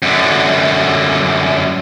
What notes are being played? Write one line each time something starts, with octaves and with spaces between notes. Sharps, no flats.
F#2 D3